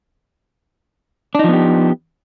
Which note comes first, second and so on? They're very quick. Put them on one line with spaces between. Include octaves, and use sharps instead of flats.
D4 D#4 F3 B3 G4